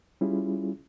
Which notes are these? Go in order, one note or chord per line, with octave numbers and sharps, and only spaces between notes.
G3 C#4 E4 F4 G#4